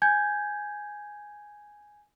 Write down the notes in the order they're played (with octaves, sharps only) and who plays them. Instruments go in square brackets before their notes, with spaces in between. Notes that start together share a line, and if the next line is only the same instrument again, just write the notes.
[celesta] G#5 G6 G#6